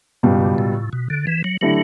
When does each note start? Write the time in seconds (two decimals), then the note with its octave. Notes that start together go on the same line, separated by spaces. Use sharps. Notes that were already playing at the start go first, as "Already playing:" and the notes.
0.23 C#2 G2 B2 G3
0.58 A2
0.93 B2
1.10 D3
1.27 E3
1.44 F#3
1.61 D3 F#3 A3 E4 G4